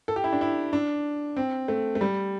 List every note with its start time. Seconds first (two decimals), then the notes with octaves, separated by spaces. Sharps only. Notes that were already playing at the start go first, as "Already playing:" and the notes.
0.08 A4
0.16 G4
0.24 E4
0.32 D4
0.41 E4
0.73 D4
1.36 C4
1.68 A3
1.95 A3
2.01 G3